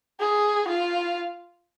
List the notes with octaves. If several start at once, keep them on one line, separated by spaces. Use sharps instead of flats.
G#4
F4